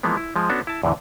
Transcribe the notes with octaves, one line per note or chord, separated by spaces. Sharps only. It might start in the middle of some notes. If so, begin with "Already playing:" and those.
E3 F3 G#3 A#3 B3
E4
F3 G#3
B3 C#4 D4 F#4 A4
E4 A5
E2 A2 D3 E3